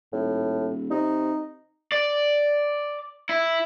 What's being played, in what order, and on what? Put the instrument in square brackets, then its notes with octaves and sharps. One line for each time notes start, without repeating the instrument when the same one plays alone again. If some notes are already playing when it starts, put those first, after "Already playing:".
[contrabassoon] D#1 [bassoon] A2
[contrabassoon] C3 [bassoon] D#4
[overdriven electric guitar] D5
E4